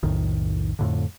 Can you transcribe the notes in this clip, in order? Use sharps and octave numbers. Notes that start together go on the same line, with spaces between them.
B1 F2 A2 D#3
F2 A2 D3